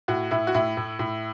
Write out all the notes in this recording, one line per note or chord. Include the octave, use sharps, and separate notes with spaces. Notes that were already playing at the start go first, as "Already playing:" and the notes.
A2 F#4
A2 E4
F#4
A2 E4
A2
A2